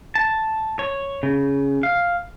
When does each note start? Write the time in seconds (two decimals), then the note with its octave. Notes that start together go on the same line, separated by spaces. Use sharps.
0.15 A5
0.79 C#5
1.23 C#3
1.83 F5